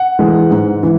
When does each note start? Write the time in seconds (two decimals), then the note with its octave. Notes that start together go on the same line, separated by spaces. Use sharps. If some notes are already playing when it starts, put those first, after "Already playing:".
Already playing: F#5
0.19 E3 G#3
0.51 G#2
0.83 E3